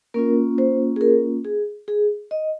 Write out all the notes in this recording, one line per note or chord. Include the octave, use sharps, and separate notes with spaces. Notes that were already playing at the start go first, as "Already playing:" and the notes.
A#3 C#4 F4 A#4
C5
G#4
A#4
G#4
G#4
D#5